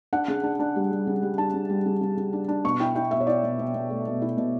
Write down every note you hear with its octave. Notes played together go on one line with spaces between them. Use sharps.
D4 F#5
C#3
D4
D4
G3
G3
C#3
G3
D4 A5
C#3
G3
C#3
C#3
C#3
D4
D4
B2 C#6
E4 G5
E4 G5
B2 E5
C#5
E4 D5
B2
B2
B2
A3
B2
E4
B2